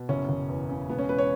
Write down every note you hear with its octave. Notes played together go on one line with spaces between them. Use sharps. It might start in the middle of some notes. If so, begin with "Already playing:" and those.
Already playing: B2
F#1 C#4
F#1
E2
C#3
E1 B3
C#4
E1 B4
C#5